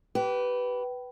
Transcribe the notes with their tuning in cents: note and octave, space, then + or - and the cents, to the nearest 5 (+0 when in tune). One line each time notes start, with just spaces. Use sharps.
G4 -30 B4 +0